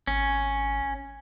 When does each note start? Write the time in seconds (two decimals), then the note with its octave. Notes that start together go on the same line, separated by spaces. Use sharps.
0.07 G#1 C#4